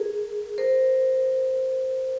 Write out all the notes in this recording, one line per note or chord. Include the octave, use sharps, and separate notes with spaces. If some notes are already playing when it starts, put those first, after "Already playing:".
Already playing: G#4 A#4
A#4 C5